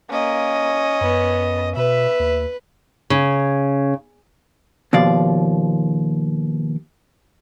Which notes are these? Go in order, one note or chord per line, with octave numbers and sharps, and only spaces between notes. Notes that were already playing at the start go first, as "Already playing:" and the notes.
A#3 C#4 D#5
F#2 B3
B2 B4 E5
D#2
C#3
D#2 B2 F3 D5 F5